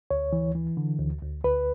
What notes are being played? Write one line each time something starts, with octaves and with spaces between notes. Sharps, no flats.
D2 C#5
E3
E3
D3
D2
D2
D2 B4